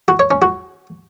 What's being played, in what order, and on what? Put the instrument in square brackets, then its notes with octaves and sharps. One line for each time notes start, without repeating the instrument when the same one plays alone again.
[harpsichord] F#4
C#5
C#4
F#4